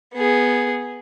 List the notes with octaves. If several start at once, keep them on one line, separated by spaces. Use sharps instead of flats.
B3 G#4